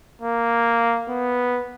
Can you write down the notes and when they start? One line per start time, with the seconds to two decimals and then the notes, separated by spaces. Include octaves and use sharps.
0.22 A#3
1.09 B3